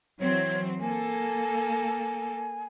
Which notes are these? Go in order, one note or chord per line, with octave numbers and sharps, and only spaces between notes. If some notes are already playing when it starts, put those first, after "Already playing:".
E3 F#3 C4 C#5
A#3 A4 G#5